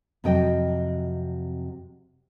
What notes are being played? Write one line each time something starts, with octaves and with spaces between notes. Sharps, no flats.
F2 C3 F#3 D#5 G5